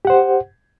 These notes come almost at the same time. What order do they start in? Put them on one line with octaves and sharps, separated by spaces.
G4 F#5 C5